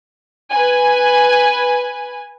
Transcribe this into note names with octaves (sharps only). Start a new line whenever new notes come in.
B4 G#5